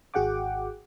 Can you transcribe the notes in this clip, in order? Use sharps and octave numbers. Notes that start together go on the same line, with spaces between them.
G#1 F#4 G#4 F#5 G5 D6